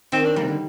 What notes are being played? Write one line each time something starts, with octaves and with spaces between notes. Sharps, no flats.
D#3 C4
D4
G3 A#3
C3
D3